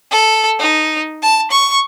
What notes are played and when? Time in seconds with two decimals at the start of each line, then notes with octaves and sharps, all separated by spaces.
0.11 A4
0.60 D#4
1.23 A5
1.51 C#6